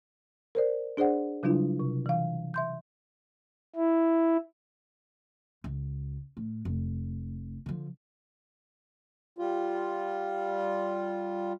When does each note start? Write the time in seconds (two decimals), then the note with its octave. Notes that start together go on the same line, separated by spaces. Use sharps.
0.55 A#4 C5 D5
0.97 D4 G#4 C5 D5 F#5
1.43 C#3 F#3 G3 D4 E4 F4
1.80 C3
2.06 E3 F5
2.54 E5 C6 G6
3.76 E4
5.64 C#2
6.37 A2
6.65 F1
7.66 D3 F3
9.38 G3 F4